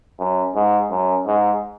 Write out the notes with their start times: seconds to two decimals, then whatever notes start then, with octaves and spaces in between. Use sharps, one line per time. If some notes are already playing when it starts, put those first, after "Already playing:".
0.19 F#2
0.55 G#2
0.90 F#2
1.26 G#2